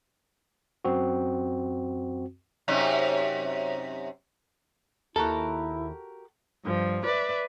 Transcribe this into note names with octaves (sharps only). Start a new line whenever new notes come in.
F#2 C4 F#4
F#2 C3 D#4
D#2 E4 F#4 G4 A4 A#4
G2 F3
B4 D5 E5